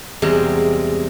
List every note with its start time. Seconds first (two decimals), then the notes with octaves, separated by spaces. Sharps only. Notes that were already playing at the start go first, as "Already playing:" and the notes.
0.22 E2 C3 G3 G#3